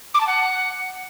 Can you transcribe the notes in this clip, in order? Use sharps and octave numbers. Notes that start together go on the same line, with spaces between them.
D6
A5
F#5